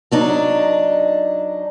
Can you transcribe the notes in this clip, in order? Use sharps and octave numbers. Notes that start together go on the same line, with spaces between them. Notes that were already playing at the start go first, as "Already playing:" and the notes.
F#3 D4 D#4